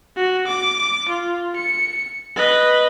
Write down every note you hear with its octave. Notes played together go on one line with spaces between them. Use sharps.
F#4
D6
F4
C#7
B4 D#5